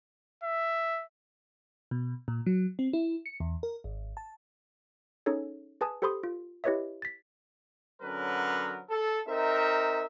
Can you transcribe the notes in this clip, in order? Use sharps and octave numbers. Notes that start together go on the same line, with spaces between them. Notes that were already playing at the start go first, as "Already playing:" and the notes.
E5
B2
A#2
F#3
C4
E4
C#7
E2
A#4
G#1
A5
C#4 D#4 G#4 A4 C#5
G#4 B4 G#5 A5 D#6
G4 A4 C5 B5 C6 D#6
F4
E4 G4 B4 C#5 D#5 E5
A6 B6
D3 F#3 C#4 A#4 B4
A4
C4 D#4 A#4 E5